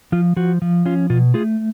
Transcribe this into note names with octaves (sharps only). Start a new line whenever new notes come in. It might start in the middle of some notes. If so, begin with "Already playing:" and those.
F3 F4
F3 F#4
F3
C#4 F4
B2 F4
A3 F4 G#4